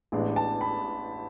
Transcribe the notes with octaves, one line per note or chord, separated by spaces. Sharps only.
A1 A2 G#3 B3 D4
A5
B5